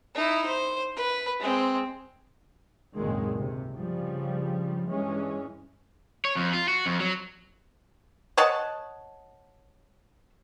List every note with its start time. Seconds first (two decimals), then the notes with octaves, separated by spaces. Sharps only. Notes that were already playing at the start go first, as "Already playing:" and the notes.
0.15 D#4 E4
0.46 C5
0.96 B4
1.40 G#3 C4
2.95 G#1 C#2 F#2 A#2 D#3 G#3
3.37 G2 C3
3.72 G2 C#3 F3 G3
4.88 G2 E3 G#3 C#4
6.25 C#5
6.36 F2
6.53 F4
6.68 F#4
6.86 F2
7.00 F#3
8.37 C#5 D#5 F#5 A5